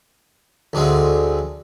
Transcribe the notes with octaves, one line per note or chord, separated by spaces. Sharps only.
D2 D3 G#3 C4